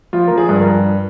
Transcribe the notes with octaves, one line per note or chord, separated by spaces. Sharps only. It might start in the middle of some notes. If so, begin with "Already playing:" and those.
F3 F4
F3 A#4
G#4
G2
A#4